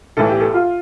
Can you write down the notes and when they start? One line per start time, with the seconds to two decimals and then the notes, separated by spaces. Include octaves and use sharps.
0.17 B1 A2 E3 A4
0.29 G4
0.41 A4
0.54 F4